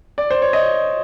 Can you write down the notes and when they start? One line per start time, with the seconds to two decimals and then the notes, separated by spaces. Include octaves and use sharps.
0.18 D5
0.31 C5
0.42 C#5
0.53 D#5